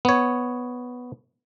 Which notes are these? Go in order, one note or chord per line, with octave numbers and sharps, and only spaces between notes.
B3 C#5